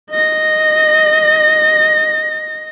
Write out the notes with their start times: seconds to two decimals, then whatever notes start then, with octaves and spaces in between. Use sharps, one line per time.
0.10 D#5 A#6